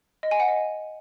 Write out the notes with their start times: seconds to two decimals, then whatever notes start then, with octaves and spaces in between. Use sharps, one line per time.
0.23 D#5
0.31 G#5
0.40 F#5
0.48 D#5